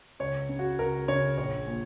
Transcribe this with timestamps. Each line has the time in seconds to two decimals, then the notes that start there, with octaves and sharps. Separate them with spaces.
0.20 C#2 C#5
0.49 C#3
0.59 F#4
0.79 C#2 A#4
1.08 C#3 C#5
1.38 A#1 C#5
1.67 A#2